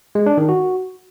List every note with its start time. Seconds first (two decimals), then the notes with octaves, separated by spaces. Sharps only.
0.15 G#3
0.26 D4
0.38 D#3
0.49 F#4